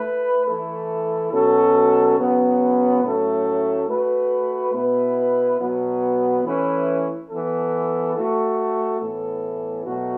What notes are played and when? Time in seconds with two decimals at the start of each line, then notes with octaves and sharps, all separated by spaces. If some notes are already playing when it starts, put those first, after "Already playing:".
Already playing: A3 E4 B4
0.47 E3 A3 E4 A4
1.32 B2 F#3 C#4 A4
2.17 C#3 F#3 B3
3.03 A2 F#3 A3 C#4 A4
3.88 A3 F#4 B4
4.73 B2 B3 E4 B4
5.59 B2 F#3 B3
6.44 E3 A3 C#4 E4 B4
7.29 E3 B3 A4
8.15 A3 F#4 A4
9.00 A2 E3 B3 E4 A4
9.85 B2 F#3 A3 F#4